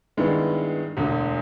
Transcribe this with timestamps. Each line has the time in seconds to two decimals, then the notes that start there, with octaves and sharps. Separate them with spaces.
0.17 G2 D#3 G#3 B3 E4
0.97 E1 D2 D3